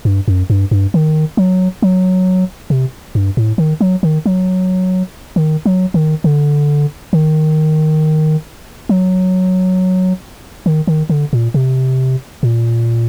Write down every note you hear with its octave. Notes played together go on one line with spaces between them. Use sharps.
G2
F#2
G2
G2
D#3
F#3
F#3
C3
G2
A2
D#3
F#3
D#3
F#3
D#3
F#3
D#3
D3
D#3
F#3
D#3
D#3
D3
A#2
C3
A#2